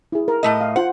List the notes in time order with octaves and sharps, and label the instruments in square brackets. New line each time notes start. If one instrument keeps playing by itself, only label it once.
[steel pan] E4 G#4
A#4
[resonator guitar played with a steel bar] A2 A3 D#5
[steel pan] F5
[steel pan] F4 C5 [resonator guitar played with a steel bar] F#5